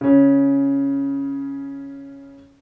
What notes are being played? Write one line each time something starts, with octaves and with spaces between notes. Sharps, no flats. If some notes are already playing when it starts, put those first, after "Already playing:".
C#3 C#4